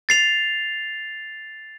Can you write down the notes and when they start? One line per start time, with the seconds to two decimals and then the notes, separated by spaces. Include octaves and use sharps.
0.09 A6 C7 F7